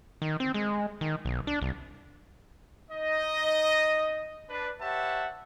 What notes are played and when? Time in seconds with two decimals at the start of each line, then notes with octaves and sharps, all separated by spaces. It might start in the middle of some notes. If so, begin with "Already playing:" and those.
0.22 D#3
0.40 C4
0.54 G#3
1.01 D#3
1.25 B1
1.47 D4
1.62 C2
2.91 D#4 D#5
4.50 D4 B4
4.81 G4 B4 C#5 E5 F#5 A5